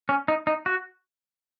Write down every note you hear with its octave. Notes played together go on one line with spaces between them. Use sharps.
C#4
D#4
D#4
F#4